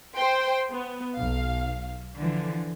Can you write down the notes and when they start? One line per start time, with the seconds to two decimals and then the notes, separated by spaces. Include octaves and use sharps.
0.14 C5 G5 C6
0.71 B3
1.15 B1 F5
2.18 D3 E3 F3